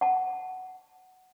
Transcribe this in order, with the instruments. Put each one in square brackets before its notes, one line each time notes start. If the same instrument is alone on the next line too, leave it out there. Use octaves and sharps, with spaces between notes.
[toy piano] F#5 A5